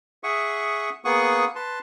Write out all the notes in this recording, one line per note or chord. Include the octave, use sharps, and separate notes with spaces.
G#4 E5 F#5 C#6 D#6
A#3 B3 G#4 F#5 C#6 D#6
B4 A5 C6